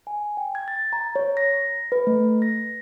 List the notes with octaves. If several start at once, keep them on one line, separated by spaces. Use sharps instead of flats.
G#5
G5
G#6
A6
A#5
C#5
A#6
B4
A3
A#6